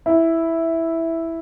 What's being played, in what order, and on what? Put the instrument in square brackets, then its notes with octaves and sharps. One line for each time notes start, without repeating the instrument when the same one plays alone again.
[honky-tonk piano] E4